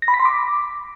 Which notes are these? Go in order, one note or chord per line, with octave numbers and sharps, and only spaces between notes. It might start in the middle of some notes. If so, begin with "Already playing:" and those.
A#6
B5
B6
C6
D6